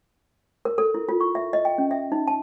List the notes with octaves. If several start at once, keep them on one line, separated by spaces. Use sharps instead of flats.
A#4
A4
E4
F4
C#6
E5
D#5
G5
C#4
E5
D#4
A5